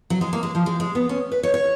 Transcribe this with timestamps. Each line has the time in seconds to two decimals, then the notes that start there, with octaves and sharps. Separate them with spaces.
0.10 F#3
0.21 G#3
0.33 A#3
0.43 G#3
0.55 F3
0.66 G#3
0.80 G#3
0.95 B3
1.09 C#4
1.32 B4
1.43 C#5
1.54 C#5